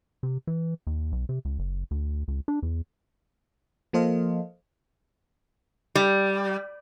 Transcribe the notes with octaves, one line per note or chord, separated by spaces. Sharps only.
C3
E3
D#2
B1
C3
C#2
F#1
D2
C#2
D4
E2
F3 A#3 A4 C5 D#5 F5
G3